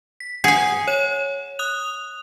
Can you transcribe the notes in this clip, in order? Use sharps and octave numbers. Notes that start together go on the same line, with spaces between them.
B6
G#4 F#5 G#5 C#7
C#5 E7
D#6 F#6 F7